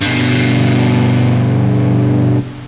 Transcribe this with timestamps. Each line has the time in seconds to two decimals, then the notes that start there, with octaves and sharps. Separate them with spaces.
0.02 G2 B2